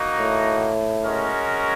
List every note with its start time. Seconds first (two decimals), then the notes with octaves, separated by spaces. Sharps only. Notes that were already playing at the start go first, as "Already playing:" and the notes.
Already playing: A#3 D#4 F#4
0.20 A2
1.04 G#3 C#4 F#4 A#4